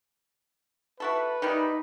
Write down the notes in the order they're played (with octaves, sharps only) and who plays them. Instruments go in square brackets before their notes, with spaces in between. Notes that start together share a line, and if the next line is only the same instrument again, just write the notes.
[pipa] E4 F#4 A4 [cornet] B4
[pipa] D#3 E3 G3 [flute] D#4